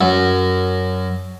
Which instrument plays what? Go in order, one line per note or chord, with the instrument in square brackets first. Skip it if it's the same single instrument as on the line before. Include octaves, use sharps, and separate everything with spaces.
[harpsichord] F#2